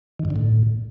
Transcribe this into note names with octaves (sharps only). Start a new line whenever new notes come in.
D#3
G2
D3
A2